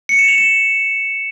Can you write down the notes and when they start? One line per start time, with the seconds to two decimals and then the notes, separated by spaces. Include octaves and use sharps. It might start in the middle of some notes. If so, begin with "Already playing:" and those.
0.09 C#7
0.19 E7
0.28 F7
0.38 E7